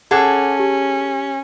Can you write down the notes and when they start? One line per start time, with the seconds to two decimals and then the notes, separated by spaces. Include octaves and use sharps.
0.11 C#4 G#4 A4 F#5 D6 F#6
0.59 G4